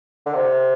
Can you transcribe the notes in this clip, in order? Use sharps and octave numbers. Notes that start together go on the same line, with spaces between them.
D3
C3